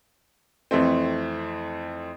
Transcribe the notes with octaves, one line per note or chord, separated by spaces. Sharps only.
F2 E3 A3 C4